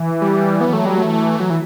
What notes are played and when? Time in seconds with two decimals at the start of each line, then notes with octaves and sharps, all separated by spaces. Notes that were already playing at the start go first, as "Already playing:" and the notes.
Already playing: E3
0.22 G3
0.60 F#3 B3
0.73 A3
0.85 G3
0.98 E3 A3
1.40 F#3
1.50 E3